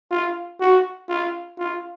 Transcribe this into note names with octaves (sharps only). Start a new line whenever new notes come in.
F4
F#4
F4
F4